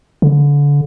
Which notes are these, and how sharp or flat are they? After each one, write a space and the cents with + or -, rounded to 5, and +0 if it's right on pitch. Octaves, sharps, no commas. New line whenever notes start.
D3 -30